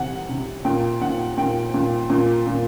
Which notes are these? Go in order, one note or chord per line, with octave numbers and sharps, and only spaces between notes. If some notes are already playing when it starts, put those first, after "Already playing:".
Already playing: C3 E3 F#5
C3
A#2 G5
A#2 F#5
A#2 G5
A#2
A#2
A#2